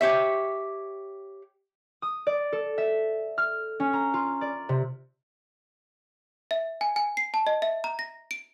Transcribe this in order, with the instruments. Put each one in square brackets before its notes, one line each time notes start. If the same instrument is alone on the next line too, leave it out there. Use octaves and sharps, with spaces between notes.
[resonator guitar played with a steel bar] G4 C#5 E5
[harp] D#6
D5
A4
E5
F6
C#4
A#5
F4
D5
C3
[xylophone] E5
G#5
G#5
C7
A5
D#5
E5
A#5
A#6
D7